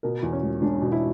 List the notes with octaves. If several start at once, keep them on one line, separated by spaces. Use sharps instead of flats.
B2 A#4
E2
C#4
E1
E1 D4
B2
E4